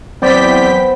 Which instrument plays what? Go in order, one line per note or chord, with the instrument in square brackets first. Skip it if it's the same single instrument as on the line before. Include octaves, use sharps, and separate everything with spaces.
[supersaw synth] E2 G5 B6 [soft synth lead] F#3 [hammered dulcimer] B3 C5 [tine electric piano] C4 D5